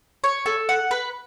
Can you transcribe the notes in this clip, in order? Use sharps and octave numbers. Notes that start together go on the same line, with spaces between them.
C#5
A4
F#5
B4